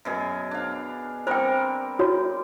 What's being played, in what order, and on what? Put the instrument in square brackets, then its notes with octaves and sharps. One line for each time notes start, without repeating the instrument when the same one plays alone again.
[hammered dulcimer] F#2 B2 G#4
D4 F5
[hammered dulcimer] G3 C4 A#4 [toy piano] C5 G5
[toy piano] F#4 C#5